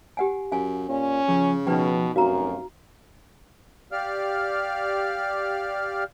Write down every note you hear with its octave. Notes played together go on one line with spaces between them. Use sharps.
G4 F#5 G#5
F#2 F5 G#5
A#2 C#4
C#3 F3
B2 F3 D#4 B4 G5
F1 F#2 F#4 F5 A#5
G4 D5 F5 F6